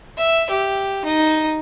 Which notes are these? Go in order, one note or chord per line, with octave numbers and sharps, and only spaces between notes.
E5
G4
D#4